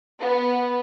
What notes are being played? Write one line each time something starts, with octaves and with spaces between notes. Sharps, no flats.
B3